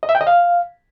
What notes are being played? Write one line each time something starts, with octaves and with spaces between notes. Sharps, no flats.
D#5
E5
G5
D#5
F5